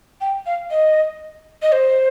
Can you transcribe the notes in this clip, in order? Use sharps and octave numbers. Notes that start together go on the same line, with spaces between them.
G5
F5
D#5
D#5
C5